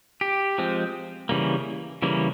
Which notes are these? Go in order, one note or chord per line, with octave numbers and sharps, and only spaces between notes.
G4
F3 G#3 C4
C#3 E3 G3 A#3
C#3 E3 G3 A#3